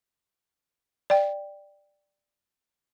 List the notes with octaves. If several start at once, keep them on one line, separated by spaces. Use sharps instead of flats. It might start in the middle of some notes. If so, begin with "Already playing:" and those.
D5 G5